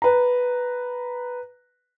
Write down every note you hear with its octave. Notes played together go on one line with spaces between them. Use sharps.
B4 A#5